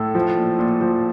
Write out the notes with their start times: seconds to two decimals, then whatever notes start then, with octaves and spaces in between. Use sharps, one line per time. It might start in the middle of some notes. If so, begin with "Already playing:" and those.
Already playing: A2 A4
0.15 F3
0.37 A#2
0.59 A#2
0.81 F3